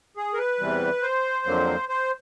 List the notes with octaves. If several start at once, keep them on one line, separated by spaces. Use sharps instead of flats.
G#4
A#4
B4
E2 C3 E3 G3
C5
F2 D3 F#3 A#3
C5